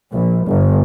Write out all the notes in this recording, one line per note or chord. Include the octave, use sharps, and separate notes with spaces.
A#1
G1